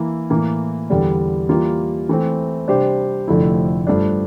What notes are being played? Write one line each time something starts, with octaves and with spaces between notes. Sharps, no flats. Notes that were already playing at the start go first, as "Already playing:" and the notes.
Already playing: E3 A#3 E4
A2 E3 A#3
E2 D3 G3 D4
E3 G3 A#3 F4
E3 A3 C4
C3 G3 D4 G4 C5
F1 F2 D3 A3 E4
G2 F3 A3 D4